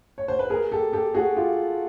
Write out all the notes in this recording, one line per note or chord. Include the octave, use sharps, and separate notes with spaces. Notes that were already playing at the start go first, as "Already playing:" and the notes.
C#5
C5
B4
G#4 A#4
G4 A4
G4 A4
F#4 G#4
F4 G4